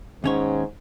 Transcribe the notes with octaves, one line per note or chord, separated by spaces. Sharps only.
D#2 G#2 C#4 C#5